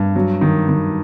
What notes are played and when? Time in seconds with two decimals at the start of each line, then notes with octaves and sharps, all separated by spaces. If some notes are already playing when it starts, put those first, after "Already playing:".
Already playing: G2
0.16 F#3
0.41 D#3
0.69 D#3